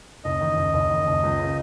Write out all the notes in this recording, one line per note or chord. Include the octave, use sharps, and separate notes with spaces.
F#1 D#5
D#3
F#1
F#1
D#3
F#1
C#2
C#3